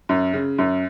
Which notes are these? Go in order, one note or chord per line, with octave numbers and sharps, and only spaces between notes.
F#2
C#3
F#2